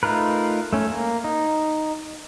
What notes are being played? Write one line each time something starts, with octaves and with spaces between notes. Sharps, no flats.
A3 D#4 F4 A#4 B4
A3 C#4
A#3
D#4